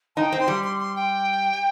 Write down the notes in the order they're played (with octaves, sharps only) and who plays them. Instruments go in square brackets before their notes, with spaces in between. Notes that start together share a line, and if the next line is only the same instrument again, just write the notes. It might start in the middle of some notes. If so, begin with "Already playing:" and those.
[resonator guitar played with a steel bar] D#4 [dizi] G5 A5
[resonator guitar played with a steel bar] C4
[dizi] C6
[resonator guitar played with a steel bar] G3
[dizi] C6
C6
G5